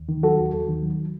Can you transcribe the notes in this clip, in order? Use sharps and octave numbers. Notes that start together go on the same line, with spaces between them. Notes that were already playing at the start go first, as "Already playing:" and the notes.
Already playing: D#2
D#3
F#3 F#4 A4
D#2
D#2
D#3
F#3